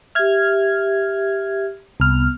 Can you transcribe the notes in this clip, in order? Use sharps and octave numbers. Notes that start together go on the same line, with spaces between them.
G4 E5 F6 G#6
C2 B3 F6